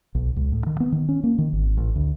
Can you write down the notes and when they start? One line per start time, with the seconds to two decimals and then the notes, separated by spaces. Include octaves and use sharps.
0.15 B1
0.36 C#2
0.52 A2
0.66 D#3
0.80 B3
0.92 D#3
1.09 C#4
1.24 A#3
1.38 D#3
1.53 G#1
1.77 A1
1.96 D2